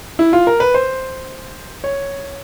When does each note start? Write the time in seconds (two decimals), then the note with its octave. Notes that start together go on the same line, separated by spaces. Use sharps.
0.19 E4
0.33 F4
0.47 A#4
0.60 B4
0.74 C5
1.84 C#5